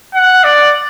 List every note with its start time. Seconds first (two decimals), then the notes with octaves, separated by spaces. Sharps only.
0.14 F#5
0.44 D5